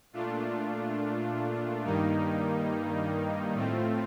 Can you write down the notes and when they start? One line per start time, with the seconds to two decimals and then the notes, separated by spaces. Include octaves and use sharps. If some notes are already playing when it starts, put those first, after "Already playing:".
0.13 A#2 A3 D4 F4
1.84 G2 D#3 G3 A#3 D#4
3.54 A2 A3 C4 F4